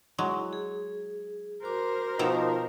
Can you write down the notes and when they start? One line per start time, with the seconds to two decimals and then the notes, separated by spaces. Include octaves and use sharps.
0.18 F#3 G#3 E4
0.53 G#4
1.63 F#4 A#4 C5 D6
2.19 B2 D#3 F3 D#4 A4 A#5